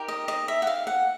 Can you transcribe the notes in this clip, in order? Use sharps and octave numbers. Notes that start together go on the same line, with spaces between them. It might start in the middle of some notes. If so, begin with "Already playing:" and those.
Already playing: D#4 G4 A#4
D#5
D#5
E5
F#5
F5
F#5